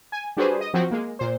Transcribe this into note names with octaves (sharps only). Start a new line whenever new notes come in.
G#5
G3 D4 F#4 G#4 B4 C5
D#5
F3 F#3 C4 F#4
G#3 A#3
A#2 C5